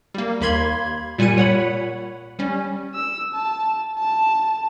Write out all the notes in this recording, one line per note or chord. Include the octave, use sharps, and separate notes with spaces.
G3 A#3
D#2 A#3 B5 C6 G#6
A#2 G3 G#5 C#7 D#7
A#2 C#5 F#5 B5
G3 C#4
E6
A5
A5